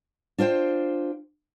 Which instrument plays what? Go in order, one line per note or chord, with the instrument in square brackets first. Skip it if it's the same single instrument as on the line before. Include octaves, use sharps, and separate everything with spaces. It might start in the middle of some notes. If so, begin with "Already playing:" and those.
[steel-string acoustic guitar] D4 F4 C5 G5